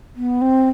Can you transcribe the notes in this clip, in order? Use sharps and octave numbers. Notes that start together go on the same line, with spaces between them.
B3
C4